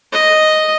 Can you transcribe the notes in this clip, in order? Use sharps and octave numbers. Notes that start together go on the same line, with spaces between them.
D#5